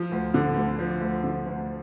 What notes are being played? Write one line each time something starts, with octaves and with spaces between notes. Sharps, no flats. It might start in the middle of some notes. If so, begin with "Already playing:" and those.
Already playing: F3
D2
D3
D2
F3
D2
D3
D2